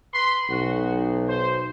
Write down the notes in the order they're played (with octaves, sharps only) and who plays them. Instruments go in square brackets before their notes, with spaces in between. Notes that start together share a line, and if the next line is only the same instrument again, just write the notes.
[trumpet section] B4 B5 C6
[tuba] B1 [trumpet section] F#4
[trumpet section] C5